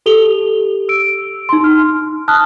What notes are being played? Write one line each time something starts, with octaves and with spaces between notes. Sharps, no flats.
G4 A4 F7 G7
E6 D7
D#4 C6
F6
A5 D#6 F6 F#6